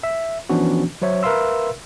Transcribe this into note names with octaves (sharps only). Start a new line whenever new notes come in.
E5
E3 F3 B3 C#4 D4 F#4
F#3 C5 C#5 E5
A#4 B4 E5 F5 C6 E6